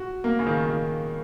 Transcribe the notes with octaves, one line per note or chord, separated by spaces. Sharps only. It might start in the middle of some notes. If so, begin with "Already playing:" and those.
Already playing: F#4
A#3
C#3
D#3
D#3